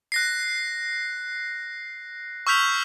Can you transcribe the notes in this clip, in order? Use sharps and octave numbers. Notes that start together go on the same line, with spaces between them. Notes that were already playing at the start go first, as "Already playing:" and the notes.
F#6 A#6 C7
C#6 E6 F6 G6 B6 F7